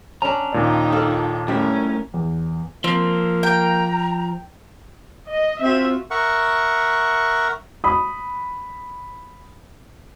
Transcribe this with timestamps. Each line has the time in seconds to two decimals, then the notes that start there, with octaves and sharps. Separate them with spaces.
0.22 C#4 D4 A#5
0.53 D#2 A#2 D#4 D5 G5
0.92 D4 F4 A4
1.48 F#2 A2 G3 C#4 A#4 E5
2.14 E2
2.84 F3 A#3 C4
3.43 G5 A#5
5.29 D#5
5.62 C4 F4 F#4 E5
6.11 A#4 E5 F#5 C#6
7.84 B5 D#6